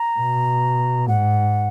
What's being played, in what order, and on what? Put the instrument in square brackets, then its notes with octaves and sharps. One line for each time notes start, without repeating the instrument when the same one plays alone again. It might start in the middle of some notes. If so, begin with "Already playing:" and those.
Already playing: [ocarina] A#5
[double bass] B2
[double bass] G#2 [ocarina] F#5